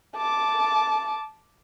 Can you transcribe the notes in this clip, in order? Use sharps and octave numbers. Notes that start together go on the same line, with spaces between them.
A5 D6